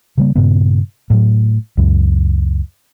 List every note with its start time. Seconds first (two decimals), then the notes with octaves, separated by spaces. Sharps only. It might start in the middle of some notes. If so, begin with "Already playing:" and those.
0.18 C#3 G3 A#3
0.36 G2 A#2 C#3 B3
1.10 A2 F#3
1.77 C#2 F#2